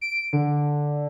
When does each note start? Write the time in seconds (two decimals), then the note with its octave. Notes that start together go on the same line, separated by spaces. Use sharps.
0.01 D7
0.33 D3